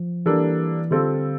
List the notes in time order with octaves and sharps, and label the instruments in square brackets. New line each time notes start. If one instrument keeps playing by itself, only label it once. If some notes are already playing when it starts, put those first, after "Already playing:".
Already playing: [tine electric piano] F3
[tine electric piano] E3 [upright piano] G3 A#3 D4 A4
[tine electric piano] D3 [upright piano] G3 C4 F4 A4